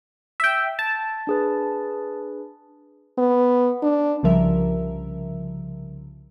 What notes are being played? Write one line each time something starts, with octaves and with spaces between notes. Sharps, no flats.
E5 G5
A5
D4 G#4 B4
B3
D4
C2 C#3 F3 G3 A#4 E5